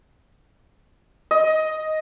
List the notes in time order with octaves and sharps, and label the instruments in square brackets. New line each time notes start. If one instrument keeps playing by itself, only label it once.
[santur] D#5